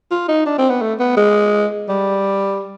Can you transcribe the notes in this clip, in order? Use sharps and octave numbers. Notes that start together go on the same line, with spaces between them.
F4
D#4
D4
C4
B3
A3
B3
G#3
G3